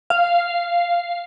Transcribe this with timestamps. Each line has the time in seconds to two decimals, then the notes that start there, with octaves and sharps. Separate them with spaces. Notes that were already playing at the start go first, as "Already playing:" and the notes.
0.10 F5